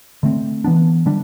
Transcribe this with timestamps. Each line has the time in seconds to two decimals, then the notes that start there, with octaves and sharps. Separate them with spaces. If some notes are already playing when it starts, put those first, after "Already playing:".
0.23 D3 A3 C4
0.64 E3 B3 D4
1.06 D3 G3 D4